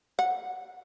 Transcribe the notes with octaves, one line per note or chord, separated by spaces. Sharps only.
F#5